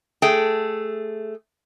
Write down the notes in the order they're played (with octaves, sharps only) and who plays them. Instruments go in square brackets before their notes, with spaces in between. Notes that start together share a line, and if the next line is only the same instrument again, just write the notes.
[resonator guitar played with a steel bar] A3 G#4 G5